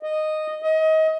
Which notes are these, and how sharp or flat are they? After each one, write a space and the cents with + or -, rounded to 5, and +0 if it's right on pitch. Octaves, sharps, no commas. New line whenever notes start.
D#5 -5
D#5 +30